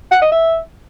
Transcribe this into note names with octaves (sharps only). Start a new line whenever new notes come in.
F#5
D#5
E5